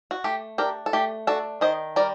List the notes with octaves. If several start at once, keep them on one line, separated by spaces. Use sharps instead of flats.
F#4
A3 G4
D4 G4 A#4
A4
A3 G4
D4 F#4 A4
D#3 C5 D#5
G3 A#4 D5